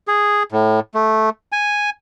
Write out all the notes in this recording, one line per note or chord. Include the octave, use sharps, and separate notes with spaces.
G#4
A2
A3
G#5